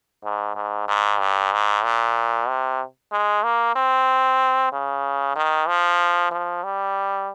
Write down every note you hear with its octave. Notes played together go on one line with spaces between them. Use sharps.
G#2
G#2
G#2
G2
G#2
A#2
C3
G#3
A#3
C4
C#3
D#3
F3
F3
G3